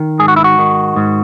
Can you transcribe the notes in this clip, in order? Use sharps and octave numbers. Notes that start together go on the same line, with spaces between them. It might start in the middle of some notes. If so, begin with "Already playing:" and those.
Already playing: D#3
G#2 G#4
F#4
E4
F#4
D#3
G#2